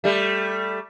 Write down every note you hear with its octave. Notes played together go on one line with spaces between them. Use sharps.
G3 A3